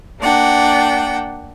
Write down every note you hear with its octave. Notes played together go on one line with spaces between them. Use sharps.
A#3 D4 F#5 G5